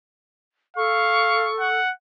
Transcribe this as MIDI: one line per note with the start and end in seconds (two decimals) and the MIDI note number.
0.77 1.80 69
0.77 1.49 77
0.77 1.68 85
1.60 1.92 78